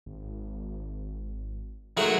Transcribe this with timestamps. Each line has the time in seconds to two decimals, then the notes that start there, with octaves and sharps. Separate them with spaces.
0.06 G#1
1.97 D#3 F#3 G#3 A3